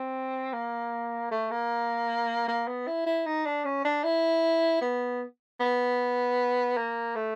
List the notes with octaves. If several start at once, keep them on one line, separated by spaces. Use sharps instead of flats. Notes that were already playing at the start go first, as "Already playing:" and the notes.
Already playing: C4
A#3
A3
A#3
A#3
B3
E4
E4
D#4
D4
C#4
D4
E4
B3
B3
A#3
A3